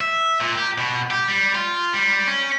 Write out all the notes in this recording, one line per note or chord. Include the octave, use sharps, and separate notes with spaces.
E5
A#2
G4
B2
G4
G3
F4
G3
C#4